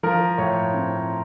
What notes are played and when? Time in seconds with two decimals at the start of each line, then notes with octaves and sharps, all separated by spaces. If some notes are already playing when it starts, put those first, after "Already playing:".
0.03 F3 A#4
0.38 A2 C#5
0.74 C4